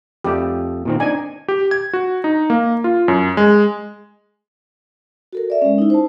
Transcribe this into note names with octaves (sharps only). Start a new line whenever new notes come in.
F2 A3 G4
A#2 D#3 C4
D4 D#4 D5 G#5
G4
G#6
F#4
D#4
A#3
F4
F#2
G#3
F#4 A4 A#4
D5 E5
G#3 C#4
D#4 E4
C5 A5